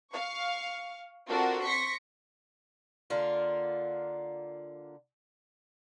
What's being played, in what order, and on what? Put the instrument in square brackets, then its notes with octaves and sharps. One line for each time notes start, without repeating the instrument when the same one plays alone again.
[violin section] F5 C#6
C4 D4 F4 F#4 A4 A#4
C6 C#6 A#6 B6 C#7
[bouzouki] D3 A#3 F4